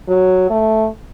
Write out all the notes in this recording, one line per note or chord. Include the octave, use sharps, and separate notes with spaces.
F#3
A3